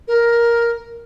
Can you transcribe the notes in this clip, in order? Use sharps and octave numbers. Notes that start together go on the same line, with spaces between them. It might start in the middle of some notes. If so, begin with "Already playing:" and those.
A#4